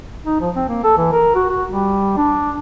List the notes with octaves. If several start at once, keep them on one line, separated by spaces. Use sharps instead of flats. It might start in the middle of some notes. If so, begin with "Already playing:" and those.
D#4
F3
C4
A#3
A4
E3
A#4
F#4
F#4
G3
D4